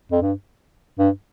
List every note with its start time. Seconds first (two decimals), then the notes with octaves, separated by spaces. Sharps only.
0.12 F2
0.22 G2
0.99 G2